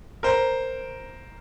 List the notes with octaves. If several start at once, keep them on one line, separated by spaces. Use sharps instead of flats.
A#4 C5